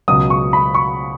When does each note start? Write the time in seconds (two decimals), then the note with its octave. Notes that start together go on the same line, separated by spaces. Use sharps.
0.08 C#2 B2 F#3 D#6
0.30 C#6
0.53 B5
0.75 C#6